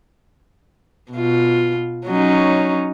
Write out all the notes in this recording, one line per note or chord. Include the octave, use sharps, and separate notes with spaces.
B2 F4
F#3 C#4 D#4